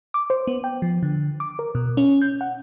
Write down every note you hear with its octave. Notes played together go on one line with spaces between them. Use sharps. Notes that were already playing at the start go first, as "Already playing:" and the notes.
D6
C5
B3
G5
F3
D3
D6
A#4
B2
C#4
G6
F#5